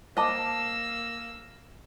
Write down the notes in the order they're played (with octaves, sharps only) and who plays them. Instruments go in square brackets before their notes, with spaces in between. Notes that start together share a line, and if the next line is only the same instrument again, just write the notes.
[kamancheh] A#3 E6 [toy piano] C5 D6 [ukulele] D#5 A5